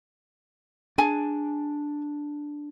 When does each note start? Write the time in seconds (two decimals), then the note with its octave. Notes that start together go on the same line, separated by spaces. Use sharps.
0.98 D4 G#4 G#5 A5